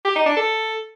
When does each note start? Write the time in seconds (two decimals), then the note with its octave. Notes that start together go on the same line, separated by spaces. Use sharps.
0.05 G4
0.15 D#4
0.26 D4
0.36 A4